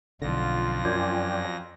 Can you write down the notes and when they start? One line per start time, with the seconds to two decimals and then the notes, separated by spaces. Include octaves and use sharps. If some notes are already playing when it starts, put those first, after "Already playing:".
0.22 B1 F2 D3 F4 A#6
0.85 F#2 D5 G5 G#5